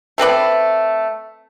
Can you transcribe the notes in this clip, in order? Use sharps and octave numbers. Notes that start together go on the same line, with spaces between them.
A3 C4 B4 D5